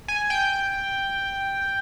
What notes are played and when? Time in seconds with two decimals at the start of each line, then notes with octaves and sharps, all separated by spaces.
0.08 G#5
0.30 G5